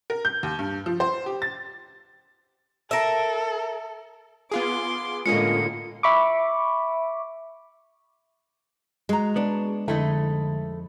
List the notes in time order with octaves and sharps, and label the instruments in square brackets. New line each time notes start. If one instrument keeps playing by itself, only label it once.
[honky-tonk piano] A#4
G6
D#2
G2
F3
C5
G4
A6
[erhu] A4 [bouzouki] A#4 E5
[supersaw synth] B3 F4 G#4 [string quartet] C6 D6
[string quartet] A2 D3 A#3 [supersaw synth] G#3 C#4 D#5 [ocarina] F4 [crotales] C#7
[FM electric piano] E5 B5 C#6 D6
[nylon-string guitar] G#3 [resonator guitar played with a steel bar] F#4 A#5
[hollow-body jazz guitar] B3 D4
[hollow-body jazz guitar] F2 D#4 [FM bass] D3 [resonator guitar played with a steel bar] A3 E4 D#5